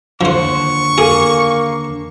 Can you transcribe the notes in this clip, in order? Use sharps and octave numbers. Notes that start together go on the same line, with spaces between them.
D#2 D3 F3 C5 C#6
A#3 G#4